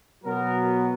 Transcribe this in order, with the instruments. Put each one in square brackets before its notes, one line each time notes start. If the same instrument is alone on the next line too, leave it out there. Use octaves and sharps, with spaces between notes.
[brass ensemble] B2 F#3 B3 A#4